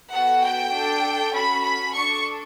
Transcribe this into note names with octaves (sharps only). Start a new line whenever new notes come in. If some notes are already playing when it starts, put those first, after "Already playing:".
B3 F#4 A4 F#5
G5
D4 A4
C#4 F#4 A4 B5
B5
D4 A4 C#6